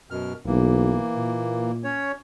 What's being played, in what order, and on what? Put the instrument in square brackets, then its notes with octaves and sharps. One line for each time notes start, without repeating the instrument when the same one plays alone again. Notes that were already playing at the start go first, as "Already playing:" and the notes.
[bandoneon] F#2 B2 F6
[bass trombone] B1 [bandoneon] E3 A#3
[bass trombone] A#2
[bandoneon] C#4 C#5